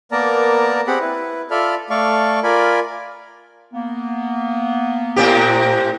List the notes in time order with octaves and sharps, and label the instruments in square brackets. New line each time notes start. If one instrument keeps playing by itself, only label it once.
[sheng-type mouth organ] A#3 B3 A#4 D5 A5 A#5
C4 G4 G#4 F#5 B5
E4 B4
F4 A4 D5 E5 B5 F6
A3 A4 D5 F5 C#6
F4 A#4 D5 G#5 B5
[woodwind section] A#3 B3
[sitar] A2 C4 G4
[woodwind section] A#2 A5 A#5